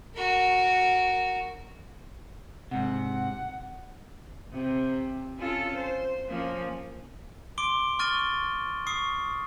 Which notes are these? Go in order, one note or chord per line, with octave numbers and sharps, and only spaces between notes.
F#4 A#4
G#2 C3 F#5
C3
C#4 F4 A4
C5
F3 A#3 C#4
C6 D6 D7 G7
C#6 F6 A6 D#7 G7
C#6 D#6 C7